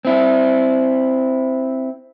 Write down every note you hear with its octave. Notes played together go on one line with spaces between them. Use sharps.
C4 E4